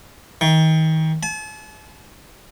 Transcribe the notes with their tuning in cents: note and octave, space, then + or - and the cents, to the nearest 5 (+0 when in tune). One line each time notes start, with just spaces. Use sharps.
D#3 +30
A5 -40